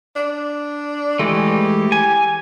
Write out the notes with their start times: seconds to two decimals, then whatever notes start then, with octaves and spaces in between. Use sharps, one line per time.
0.16 D4
1.19 E3 G#3 A3 G4
1.92 G#5